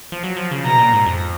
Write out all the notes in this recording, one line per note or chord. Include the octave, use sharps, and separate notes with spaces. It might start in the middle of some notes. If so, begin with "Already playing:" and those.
F3
F#3
F3
C#3
B2 A#5
A#2
G#2
F2